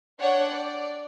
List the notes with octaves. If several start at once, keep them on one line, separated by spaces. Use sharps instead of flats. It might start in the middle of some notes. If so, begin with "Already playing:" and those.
D4 C#5 F#5 G5
D5